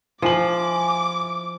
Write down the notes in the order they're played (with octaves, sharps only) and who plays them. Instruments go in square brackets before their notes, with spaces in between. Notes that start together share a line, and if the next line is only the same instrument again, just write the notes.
[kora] F3 [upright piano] E4 G#5 F#7 [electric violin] D6